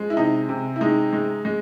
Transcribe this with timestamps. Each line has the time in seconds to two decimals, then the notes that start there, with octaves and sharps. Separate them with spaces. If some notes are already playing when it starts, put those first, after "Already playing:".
Already playing: F3 G#3
0.10 E4
0.17 C3 D#4
0.49 C3
0.76 E4
0.81 G#3 D#4
1.13 G#3
1.45 G#3